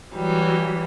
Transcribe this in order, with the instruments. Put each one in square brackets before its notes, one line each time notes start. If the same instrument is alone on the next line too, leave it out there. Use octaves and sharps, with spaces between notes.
[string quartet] E3 F#3 G3